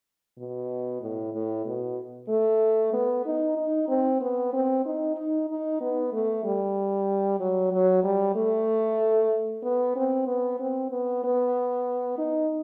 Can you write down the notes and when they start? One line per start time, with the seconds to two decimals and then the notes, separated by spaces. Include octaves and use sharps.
0.38 B2
1.01 A2
1.33 A2
1.66 B2
2.29 A3
2.93 B3
3.26 D#4
3.57 D#4
3.88 C4
4.21 B3
4.53 C4
4.85 D#4
5.16 D#4
5.49 D#4
5.81 B3
6.13 A3
6.44 G3
7.40 F#3
7.72 F#3
8.04 G3
8.35 A3
9.63 B3
9.96 C4
10.27 B3
10.60 C4
10.91 B3
11.24 B3
12.18 D#4